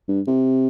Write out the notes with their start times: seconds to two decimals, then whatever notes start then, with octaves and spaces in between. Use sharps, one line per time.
0.08 G2
0.27 C3